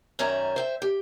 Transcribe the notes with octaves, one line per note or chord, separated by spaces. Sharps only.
F#2 D#3 C#4 D5 E5 A#5
C5 E5 G5
G4